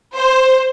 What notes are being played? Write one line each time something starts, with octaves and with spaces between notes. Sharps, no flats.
C5